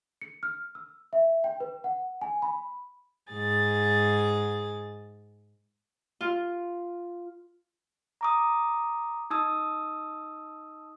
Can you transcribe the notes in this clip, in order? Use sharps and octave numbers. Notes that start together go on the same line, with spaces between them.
C#7
F6
E6
E5
G5
B4
F#5
G#5
B5
G#2 G#4 A6
F4
A#5 D6 D#6
D#4 A5 D#6 E6